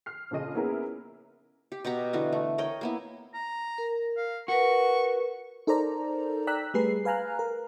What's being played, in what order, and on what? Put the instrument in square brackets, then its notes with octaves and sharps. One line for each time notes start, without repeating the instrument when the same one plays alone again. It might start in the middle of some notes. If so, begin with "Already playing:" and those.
[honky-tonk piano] F6 C7
A#1 F2 C#3 D#5 D#7
A#3 B3 C#4 E4 G#4 A#4
[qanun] G4
B2 G4 F#5 A#5
D3 E3 F#4
A3
A#4 C#5 D#5 G5
A#3 B3 E4
[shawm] A#5
[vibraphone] A#4
[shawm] F5
[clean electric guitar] F#4 [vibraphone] A#4 B4 [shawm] C#6
[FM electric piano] D#4 A4 A#4 C5 D5 A#5
D5 G5 A#5 E6 F#6 B6
G3 A3 G#4 B4 C7
B4 F5 G#5 A#5 F6 F#6
A#4